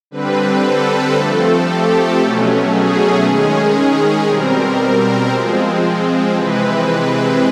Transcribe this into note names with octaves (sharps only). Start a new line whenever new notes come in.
D3 G3 C4 B4
A4
F3 A3 C4 A4
G4
B2 F#3 A3 C#4
G#4
D#3 G#3 C#4 G#4
B2 G3 C4 A#4
F3 G#3 C4
C3 E3 G#3 C4 B4